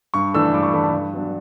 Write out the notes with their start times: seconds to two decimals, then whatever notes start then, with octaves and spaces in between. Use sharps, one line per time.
0.14 G2 C#6
0.34 E3 A3 D4 E6
0.53 G2 D6
0.63 C#6
0.73 E3 A3 D4 B5
0.84 A5
0.92 G2
1.13 F#3 B3 D4